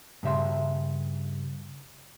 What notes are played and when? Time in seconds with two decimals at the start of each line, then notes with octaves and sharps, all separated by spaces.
0.23 G2 C#3 E5 C6